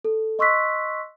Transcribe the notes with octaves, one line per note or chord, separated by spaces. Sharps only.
A4
D#5 C6 C#6 E6 F#6 B6